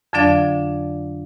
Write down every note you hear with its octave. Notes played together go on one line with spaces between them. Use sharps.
F2 D3 F#3 D4 D5 F5